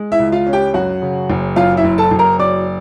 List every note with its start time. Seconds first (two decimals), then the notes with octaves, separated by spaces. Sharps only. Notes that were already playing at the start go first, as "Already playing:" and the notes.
Already playing: G#3
0.12 E4 E5
0.19 C#2
0.32 F4 F5
0.47 C#4
0.53 G4 G5
0.74 F#2 F#4 F#5
1.02 C#3
1.30 F#1
1.56 F#2 F4 F5
1.77 E4 E5
1.84 F#1
1.98 A4 A5
2.11 F#1
2.19 A#4 A#5
2.39 F#3 D5 D6